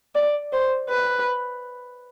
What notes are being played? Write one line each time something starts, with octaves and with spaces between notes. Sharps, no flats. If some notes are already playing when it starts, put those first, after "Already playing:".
D5
C5
B4